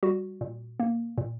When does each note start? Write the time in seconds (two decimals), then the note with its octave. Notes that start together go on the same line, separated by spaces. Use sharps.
0.03 G3 F#4
0.41 A#2
0.80 A#3
1.18 A#2